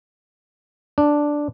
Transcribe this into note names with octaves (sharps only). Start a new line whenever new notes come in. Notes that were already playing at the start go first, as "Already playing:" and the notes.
D4